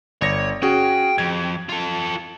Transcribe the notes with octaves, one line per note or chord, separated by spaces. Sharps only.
G1 C#5 D5 A#6
C#4 F#4 G#4 G5
F2 G#6
F4 A4